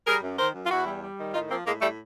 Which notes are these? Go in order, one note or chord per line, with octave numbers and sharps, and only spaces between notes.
G3 G#4 A#4
F#2
D#3 A#4 C5
F#2
F4
E2 E4 F#4
G3
G3
D#3
A2 D#4 F4
F3 A#3 C4
A2 G#3 A#3
A2 G3 A3